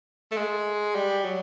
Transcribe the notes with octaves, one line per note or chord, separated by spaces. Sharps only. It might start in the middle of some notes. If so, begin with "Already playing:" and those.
A3
G#3
G3
F#3